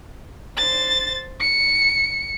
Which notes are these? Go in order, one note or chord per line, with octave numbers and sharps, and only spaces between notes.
C5 A6
C#7